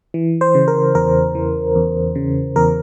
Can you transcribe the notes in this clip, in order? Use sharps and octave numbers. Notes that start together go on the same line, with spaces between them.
E3
C5
C#3
A#4
E2 A#4
E3
E2
C#3
E2 A#4